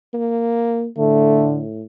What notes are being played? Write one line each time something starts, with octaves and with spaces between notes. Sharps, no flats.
A#3
A2 D3 A3